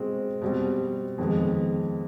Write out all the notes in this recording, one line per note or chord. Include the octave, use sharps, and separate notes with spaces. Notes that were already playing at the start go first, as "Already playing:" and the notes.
Already playing: B2 G#3 C4 F4
B2 G3 C4
F2 D#3 G#3 B3